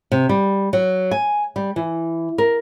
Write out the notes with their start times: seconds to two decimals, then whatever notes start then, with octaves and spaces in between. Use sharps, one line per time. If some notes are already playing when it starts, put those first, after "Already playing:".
0.12 C3
0.29 G3
0.73 F#3
1.11 G#5
1.56 G3
1.76 E3
2.38 A#4